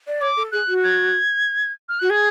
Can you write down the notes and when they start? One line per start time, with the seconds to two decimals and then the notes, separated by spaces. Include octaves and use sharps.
0.07 D5
0.21 C#5 D6
0.37 A4
0.52 G#4 F#6
0.68 F#4
0.84 G#6
1.89 F6
1.99 F#4 F#6
2.10 G#4 G#6